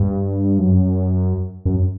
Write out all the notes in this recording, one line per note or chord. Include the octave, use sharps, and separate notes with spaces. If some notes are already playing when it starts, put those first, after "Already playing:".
Already playing: G2
F#2
F#2